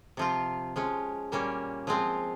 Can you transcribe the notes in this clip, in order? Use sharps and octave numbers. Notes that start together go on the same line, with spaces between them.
C3 F3 C4 F4
F3 G#3 C#4
A#2 G3 A#3 C#4
F3 G#3 C4 F4